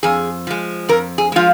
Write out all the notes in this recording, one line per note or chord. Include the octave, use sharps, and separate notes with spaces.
F2 G#4
F3 G#3
F2 A#4
G#4
F3 G#3 F4